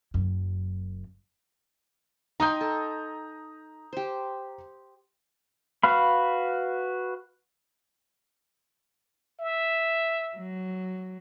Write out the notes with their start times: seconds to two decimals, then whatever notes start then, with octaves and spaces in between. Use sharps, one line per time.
0.14 F#1 F#2
2.40 D#4 G5 A#5 C6 D#6 G6
2.61 A4
3.93 G4 C5
5.83 F#4 B4 F5 B5
9.40 E5
10.37 F#3